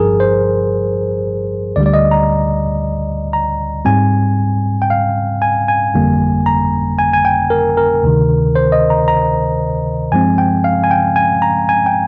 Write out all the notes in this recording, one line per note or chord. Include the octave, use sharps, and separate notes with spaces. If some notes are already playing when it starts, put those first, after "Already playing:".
Already playing: G1 G2 F3 G#4 A#4
C5
D2 D3 G3 D5
D5
D#5
A#5
A#5
G#2 G3 C4 G#5
G5
F5
G#5
G#5
G1 F2 D3 G3 A#3
A#5
G#5
G#5
G5
A#4
A#4
D2 C3 D#3
C5
D#5
A#5
A#5
G2 F3 G#3 C4 G#5
G5
F5
G#5
G5
G#5
A#5
G#5
G5